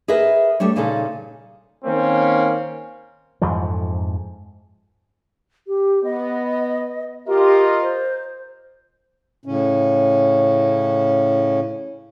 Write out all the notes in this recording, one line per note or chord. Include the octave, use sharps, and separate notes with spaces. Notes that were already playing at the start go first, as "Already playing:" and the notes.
G#4 A#4 B4 D#5 E5
G3 A3 D4 C#5
A#2 C#3 D#4 G#4 A4
D#3 A#3 C4 C#4
F2 G#2 E3 F3
G4
B3 D#5
F4 G4 A#4 D#5
C5
A2 C#3 C#4